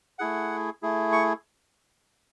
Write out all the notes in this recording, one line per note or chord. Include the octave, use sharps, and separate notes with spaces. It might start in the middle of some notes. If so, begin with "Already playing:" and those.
A3 E4 G#4 F#5
A3 E4 G#4
C#6